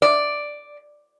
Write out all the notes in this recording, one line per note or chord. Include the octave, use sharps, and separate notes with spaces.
D5